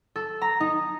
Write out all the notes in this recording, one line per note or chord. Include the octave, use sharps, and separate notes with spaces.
A4
A#5
D#4